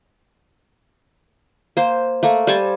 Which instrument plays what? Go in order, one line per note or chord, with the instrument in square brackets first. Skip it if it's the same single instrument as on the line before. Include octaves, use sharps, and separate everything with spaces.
[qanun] A#3 C5
A3 A#3
G3 C5 G#5 A5